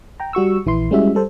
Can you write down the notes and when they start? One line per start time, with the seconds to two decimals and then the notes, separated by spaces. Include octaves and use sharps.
0.20 G5 A#5
0.33 G3 F#4 C#6 E6
0.66 A#1 E3 E4 C6
0.91 G3 G#3 C#4 E4 F#4 E5
1.15 G3 A4 C5